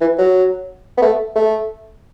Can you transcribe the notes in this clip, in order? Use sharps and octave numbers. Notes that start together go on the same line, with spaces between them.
E3
F#3
B3
A3
A3